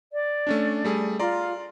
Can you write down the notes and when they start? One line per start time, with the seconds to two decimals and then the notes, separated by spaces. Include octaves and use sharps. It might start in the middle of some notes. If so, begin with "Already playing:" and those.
0.12 D5
0.47 A3 C#4 D4
0.84 G3 A3 G#4
1.20 F4 D5 A#5 C6